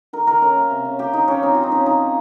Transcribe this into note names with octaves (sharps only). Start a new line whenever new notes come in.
D#3 A#4
D#3 A#4
C#4 A#4
A#3
C3
C#4
A#3 G4
D#3 D#4
F3 C#4
C4 D#4
F3 F4
D#4
C4 C#4
F3 D#4
F3